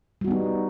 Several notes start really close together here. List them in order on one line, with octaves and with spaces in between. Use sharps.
G3 F#4 B3 D#4